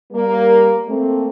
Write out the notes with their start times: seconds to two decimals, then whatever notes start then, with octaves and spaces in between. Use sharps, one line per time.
0.12 G3 A#3
0.88 A3 A#3 C4